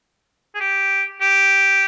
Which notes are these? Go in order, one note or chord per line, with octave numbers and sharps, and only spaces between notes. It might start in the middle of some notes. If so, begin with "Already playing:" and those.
G#4
G4
G4